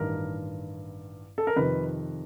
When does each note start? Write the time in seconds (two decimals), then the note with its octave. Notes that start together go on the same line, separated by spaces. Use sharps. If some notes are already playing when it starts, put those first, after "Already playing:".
Already playing: A1 G2 D#3 A#4
1.38 A4
1.47 A#4
1.56 F2 C3 D#3 B4